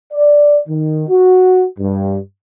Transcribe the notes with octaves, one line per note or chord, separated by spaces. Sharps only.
D5
D#3
F#4
G2